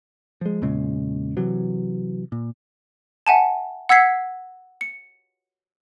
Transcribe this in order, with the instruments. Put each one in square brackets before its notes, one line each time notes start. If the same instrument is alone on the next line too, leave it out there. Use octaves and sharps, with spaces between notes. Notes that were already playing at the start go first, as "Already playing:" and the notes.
[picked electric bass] F3 G#3
E2 A#2 C#3 G#3
C3 E3 F#3
A#2
[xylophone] E5 F#5 G#5 A5
F#5 E6 G#6 B6 C7
C#7